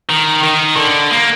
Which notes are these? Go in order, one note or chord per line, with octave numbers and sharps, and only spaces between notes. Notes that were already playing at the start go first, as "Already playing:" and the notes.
D#3
D#3
D3
A#3